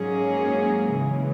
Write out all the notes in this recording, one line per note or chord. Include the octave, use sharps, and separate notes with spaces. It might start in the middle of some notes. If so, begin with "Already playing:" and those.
Already playing: G#2 F#3 A#3 C#4 G#4
C#3 E3 G#3